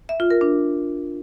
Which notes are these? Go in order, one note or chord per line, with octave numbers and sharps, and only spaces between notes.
E5
F4
A#4
D4